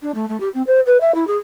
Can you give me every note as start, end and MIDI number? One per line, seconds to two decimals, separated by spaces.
0.02 0.11 62
0.14 0.28 57
0.28 0.39 57
0.40 0.49 67
0.54 0.62 60
0.67 0.80 72
0.86 0.97 71
1.00 1.14 76
1.14 1.27 64
1.27 1.36 68